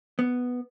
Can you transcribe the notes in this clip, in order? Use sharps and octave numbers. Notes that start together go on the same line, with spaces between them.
B3